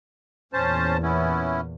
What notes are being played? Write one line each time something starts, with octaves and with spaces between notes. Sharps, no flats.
E2 A#2 C#4 C5 A5
B3 C#4 E4